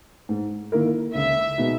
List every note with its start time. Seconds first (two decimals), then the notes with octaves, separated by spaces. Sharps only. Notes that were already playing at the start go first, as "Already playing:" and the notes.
0.29 G#2
0.72 D#3 A#3 E4 A#4
1.14 C#2 E5
1.58 B2 G#3 B3 D#4